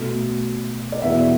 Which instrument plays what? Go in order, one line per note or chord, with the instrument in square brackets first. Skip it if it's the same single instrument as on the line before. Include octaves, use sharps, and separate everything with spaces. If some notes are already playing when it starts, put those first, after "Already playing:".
Already playing: [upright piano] B2 A3
D5
E2 B2 B3 E5